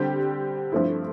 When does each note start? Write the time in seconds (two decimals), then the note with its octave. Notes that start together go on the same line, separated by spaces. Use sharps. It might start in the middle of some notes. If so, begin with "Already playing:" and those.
Already playing: D3 G3 C4 G4
0.72 G2 F3 A3 C4 E4